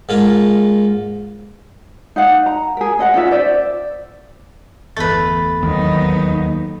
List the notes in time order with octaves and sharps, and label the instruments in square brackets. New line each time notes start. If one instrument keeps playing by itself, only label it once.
[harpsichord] G#2 A#3 F4
[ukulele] D#4 F5 F#5
A#5
G#4 A#4
C#4 D#5 F#5
C#4 D#4 F4 E5
C5 D5 E5
[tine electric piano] G1 E2 A6 [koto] A3 B4
[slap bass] D#2 D#3 [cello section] F#3 B3 D#4